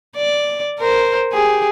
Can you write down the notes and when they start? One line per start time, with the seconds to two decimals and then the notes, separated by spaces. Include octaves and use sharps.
0.16 D5
0.79 A#4 C5
1.32 G4 G#4